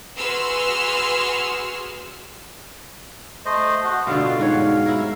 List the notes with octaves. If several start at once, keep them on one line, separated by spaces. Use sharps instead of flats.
F#4 G#4 B4 C6 E6 F6
A3 C5 D#5
F#4
B2 D3 F4 F5
G#2 F#4 C#5
E4 A#4